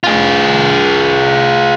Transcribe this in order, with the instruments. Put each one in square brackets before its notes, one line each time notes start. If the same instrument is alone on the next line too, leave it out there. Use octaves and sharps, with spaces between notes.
[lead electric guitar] F4 G#4